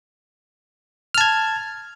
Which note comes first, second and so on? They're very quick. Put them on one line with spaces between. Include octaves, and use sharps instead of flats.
F6 A5 G#6